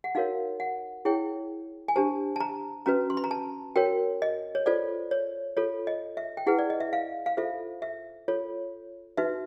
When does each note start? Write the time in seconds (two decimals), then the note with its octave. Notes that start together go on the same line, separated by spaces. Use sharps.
0.04 F#5
0.15 D#4 F#4 A#4 C#5 F5
0.60 F#5
1.05 E4 G#4 C#5 G5
1.88 G#5
1.96 D4 G4 C5 A5
2.36 A5
2.40 A#5
2.86 C#4 F#4 B4 A#5
3.10 C6
3.17 B5
3.24 A#5
3.31 A5
3.76 F#4 A#4 C#5 G5
4.22 D#5
4.55 C#5
4.66 F4 A4 C5 D5
5.11 C#5
5.57 F4 A4 C#5
5.87 D#5
6.17 E5
6.37 G5
6.46 E4 G#4 B4 F#5
6.59 D5
6.70 D#5
6.80 E5
6.93 F5
7.26 F5
7.37 F4 A4 C5 E5
7.82 E5
8.28 F4 A4 C#5
9.17 D#4 F#4 B4 E5